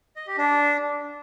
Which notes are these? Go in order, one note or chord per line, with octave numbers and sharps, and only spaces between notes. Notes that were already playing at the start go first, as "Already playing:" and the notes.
D#5
G4
D4